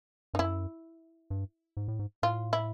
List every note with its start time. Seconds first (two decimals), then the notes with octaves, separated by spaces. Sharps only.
0.34 G2 D#4
0.39 F#2 E4
1.30 G2
1.77 G#2
1.88 A2
1.99 G#2
2.23 A2 F4
2.53 E4